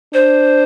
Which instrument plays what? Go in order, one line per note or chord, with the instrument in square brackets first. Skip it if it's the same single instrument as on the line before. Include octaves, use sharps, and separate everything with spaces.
[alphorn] D4 [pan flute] C5